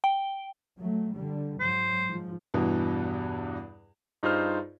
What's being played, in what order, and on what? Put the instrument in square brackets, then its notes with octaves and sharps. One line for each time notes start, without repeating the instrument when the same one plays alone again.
[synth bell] G5
[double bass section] F#3 A3
D3 G3
[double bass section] G#2 F#3 [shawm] C5
[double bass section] G#2 F3
[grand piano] E2 G2 B2 E3
[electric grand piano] G2 D#4 F4 G#4 C5 F6